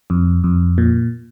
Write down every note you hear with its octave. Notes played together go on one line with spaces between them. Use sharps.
F2
F2
A#2